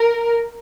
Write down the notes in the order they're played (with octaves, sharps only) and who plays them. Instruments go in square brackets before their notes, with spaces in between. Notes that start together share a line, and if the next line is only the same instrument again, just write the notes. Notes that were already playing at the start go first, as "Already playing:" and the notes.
Already playing: [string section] A#4